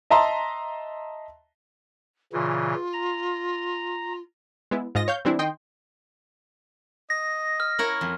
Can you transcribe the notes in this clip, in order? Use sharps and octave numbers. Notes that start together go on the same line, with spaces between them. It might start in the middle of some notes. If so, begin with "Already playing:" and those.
D#5 E5 A5 A#5 C6
A#2 C#3 E3 F4
A#5
G#3 B3 E4
G#2 F4 D#5 A#6
C#5 F5 G6
E3 G3 C4 D4 E4
D#3 D#5 G5 C6
D#5 A#6
F6
E4 A#4 C#5
F2